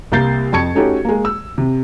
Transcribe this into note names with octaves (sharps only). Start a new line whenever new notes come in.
C2 A#3 A#4 G6 A6 C7
F2 A5 C#6 G#6 C#7
A3 C#4 D#4 F#4 G4 A4
G#3 A#3
E6
C3